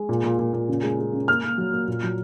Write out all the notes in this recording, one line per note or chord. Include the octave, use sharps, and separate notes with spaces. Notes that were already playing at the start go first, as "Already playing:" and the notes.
Already playing: G#3
A#2
A#2
A#2
A#2
C#3
G#3
G#3
C#3
A#3 F6
A#3
F#3
A#3
A#2
F#3